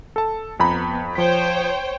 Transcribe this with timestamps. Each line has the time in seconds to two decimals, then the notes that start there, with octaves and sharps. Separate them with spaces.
0.16 A4 A5
0.60 F2 B3 A#5 B5
1.15 F3 C5 C#5 G5 B6